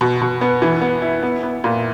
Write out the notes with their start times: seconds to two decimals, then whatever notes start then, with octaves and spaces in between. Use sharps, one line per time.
0.01 B2
0.22 B2
0.41 B3
0.62 E3
0.81 B3
1.02 E4
1.23 B3
1.43 B3
1.64 A#2